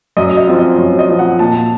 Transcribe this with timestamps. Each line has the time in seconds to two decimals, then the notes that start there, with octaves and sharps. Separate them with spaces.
0.17 F#2 D#5
0.37 D#5
0.47 F3 C4 F4
0.58 D#5
0.78 F#2 C#5
0.99 D#5
1.09 F3 C4 F4
1.19 F#5
1.39 A#2 A5